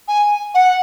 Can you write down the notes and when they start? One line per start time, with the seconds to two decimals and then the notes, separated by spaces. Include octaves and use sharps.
0.08 G#5
0.55 F#5